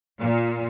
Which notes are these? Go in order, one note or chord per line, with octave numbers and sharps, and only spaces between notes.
A#2